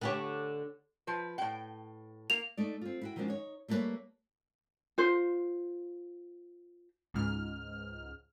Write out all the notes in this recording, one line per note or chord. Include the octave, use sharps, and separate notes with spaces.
D3 G4 C#5
F3 B4
A2 G5
A#3 F7
A3 D#4 D5
C4 F4
E4 F#4 G5
D#3 F3 G#3 C#4 D4 F#4
D#4 C#5
G3 A3 A#3 F#4 B4 C#5
F4 C5
C#2 G#2 F6